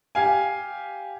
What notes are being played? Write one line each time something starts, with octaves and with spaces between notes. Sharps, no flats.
G4 F5 G#5